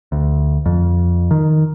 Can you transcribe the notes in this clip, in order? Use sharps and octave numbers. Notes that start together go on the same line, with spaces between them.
D2
F2
D#3